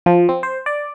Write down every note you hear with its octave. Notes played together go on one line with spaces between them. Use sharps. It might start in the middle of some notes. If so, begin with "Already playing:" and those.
F3
C4
C5
D5